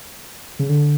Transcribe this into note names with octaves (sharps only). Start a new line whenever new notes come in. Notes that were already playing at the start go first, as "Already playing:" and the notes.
C#3
D3